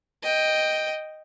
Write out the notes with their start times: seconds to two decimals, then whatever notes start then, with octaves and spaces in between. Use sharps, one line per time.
0.22 D#5 G5